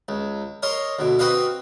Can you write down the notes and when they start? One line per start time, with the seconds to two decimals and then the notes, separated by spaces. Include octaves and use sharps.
0.08 C#2
0.63 A#4 C#5 D#5 C6
0.99 D2 B2
1.19 C4 F#4 B4 D#5 F5